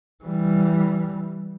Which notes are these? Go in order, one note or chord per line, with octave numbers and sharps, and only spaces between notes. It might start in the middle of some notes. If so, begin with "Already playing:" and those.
E3 G3